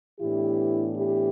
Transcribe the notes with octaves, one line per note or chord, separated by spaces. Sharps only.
A2 E3 B3 D4 E4 G4
E4 G4